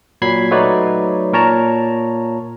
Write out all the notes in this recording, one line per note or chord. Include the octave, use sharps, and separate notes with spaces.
A#2 F#3 B5 G#6 B6 C7
F#3 A3 D#4 B4 C#5 D5
A#2 A#4 C#5 A5 A#5